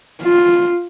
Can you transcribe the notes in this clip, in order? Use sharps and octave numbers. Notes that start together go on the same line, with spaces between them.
F4